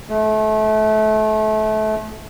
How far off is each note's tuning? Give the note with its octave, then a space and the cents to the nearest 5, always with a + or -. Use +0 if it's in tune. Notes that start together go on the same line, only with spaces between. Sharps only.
A3 -30